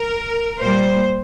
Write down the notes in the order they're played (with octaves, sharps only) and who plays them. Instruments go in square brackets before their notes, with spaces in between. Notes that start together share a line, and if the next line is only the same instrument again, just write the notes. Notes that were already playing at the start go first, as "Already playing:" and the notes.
Already playing: [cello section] A#4
A#2 G3 A#3 C5